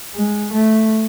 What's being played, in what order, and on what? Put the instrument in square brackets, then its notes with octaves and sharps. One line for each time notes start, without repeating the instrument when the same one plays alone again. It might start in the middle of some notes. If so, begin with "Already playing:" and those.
[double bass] G#3
A3